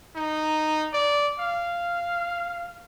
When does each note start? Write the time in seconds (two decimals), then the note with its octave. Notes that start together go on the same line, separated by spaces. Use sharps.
0.16 D#4
0.93 D5
1.40 F5